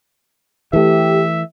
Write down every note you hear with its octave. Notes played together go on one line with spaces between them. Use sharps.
E3 A3 G4 E5